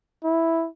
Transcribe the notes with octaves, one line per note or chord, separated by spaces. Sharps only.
E4